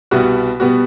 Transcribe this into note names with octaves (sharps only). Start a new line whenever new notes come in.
C2 B2 G3 B3 F#4
B2 G3 B3 F#4